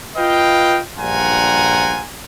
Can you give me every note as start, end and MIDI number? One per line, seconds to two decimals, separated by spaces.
0.17 0.80 65
0.17 0.80 71
0.17 0.80 75
0.17 0.80 77
0.17 0.80 79
0.98 2.06 34
0.98 2.06 43
0.98 2.06 65
0.98 2.06 78
0.98 2.06 80
0.98 2.06 82